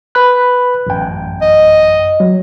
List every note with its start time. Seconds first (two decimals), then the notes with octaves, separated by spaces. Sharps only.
0.15 B4 B5 F#6
0.87 A1 F#2 G5
1.41 D#5
2.20 F#3